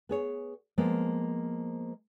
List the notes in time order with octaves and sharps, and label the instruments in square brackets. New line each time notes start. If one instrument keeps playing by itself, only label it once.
[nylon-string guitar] B3 G#4 C#5
F3 G#3 A#3 B3